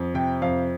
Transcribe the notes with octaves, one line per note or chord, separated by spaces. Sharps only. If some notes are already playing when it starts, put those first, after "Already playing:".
Already playing: F2
C3 G5
F2 F5